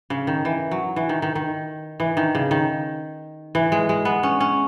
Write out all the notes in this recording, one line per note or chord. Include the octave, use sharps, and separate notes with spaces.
C#3
D#3
E3
F#3
E3
D#3
D#3
D#3
E3
D#3
C#3
D#3
E3
G#3
G#3
B3
C#4
C#4